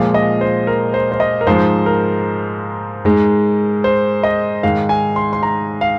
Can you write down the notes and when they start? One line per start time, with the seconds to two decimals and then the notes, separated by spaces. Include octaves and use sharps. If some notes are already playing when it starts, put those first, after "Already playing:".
Already playing: A#2 F3 G#3 F5
0.14 D#5
0.41 C5
0.67 A#4
0.94 C5
1.12 C5
1.20 D#5
1.41 A#4
1.47 G#2 F3 G#3 C5
1.86 A#4
3.05 G#2 G#3
3.84 C5
4.23 D#5
4.63 G#2 D#3 G#3 F5
4.89 G#5
5.16 C6
5.33 C6
5.43 A#5
5.81 F5